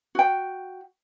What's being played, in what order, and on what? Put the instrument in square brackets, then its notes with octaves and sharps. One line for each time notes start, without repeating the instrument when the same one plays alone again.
[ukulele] F#4 G5